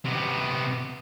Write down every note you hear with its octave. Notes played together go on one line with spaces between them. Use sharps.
C3 B3